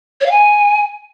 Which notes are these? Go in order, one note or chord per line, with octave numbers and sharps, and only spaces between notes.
C#5
F5
G#5